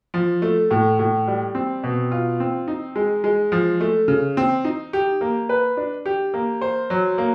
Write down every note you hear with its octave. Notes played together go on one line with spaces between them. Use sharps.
F3
A3
A2
A2
G3
C4
B2
F4
C4
D#4
G#3
G#3
F3
A3
C#3
C4
D#4
G4
A#3
B4
D4
G4
A#3
C5
F#3
A#3